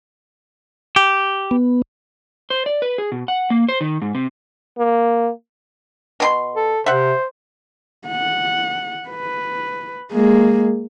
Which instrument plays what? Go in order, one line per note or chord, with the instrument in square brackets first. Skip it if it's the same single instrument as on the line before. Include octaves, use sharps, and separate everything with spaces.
[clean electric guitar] G4
[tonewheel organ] B3
[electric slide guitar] C5
D5
B4
G#4
B2
F#5
A#3
C5
D#3
G#2
C3
[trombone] A#3
[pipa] B2 E4 C6
[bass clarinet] A4
[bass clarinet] C3 [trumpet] C5 [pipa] E5 F#5
[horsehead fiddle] F#5
B4
G#3 A#3